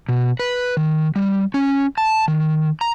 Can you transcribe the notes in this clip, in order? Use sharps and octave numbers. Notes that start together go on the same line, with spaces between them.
B2
B4
D#3
G3
C#4
A5
D#3
A#5